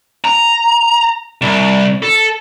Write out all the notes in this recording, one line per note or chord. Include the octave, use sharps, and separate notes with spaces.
A#5
C2
A4